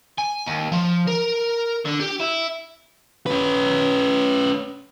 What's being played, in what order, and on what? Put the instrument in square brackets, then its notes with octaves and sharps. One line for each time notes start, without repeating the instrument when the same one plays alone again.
[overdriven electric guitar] G#5
D#2
F3
A#4
D3
G4
E4
[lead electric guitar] C#4 B4